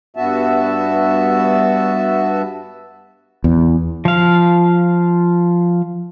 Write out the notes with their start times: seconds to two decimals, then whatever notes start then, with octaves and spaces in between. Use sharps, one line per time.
0.17 G2 B3 F#4 E5 A5
3.44 E2
4.05 F3 F5